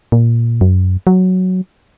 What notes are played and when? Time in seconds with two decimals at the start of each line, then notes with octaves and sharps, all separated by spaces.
0.12 A#2
0.61 F#2
1.07 F#3